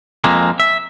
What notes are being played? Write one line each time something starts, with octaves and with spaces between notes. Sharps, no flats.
F2 G#3 A#3 C4
E5